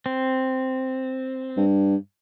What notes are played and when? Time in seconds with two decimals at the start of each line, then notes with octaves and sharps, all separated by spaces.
0.06 C4
1.57 G2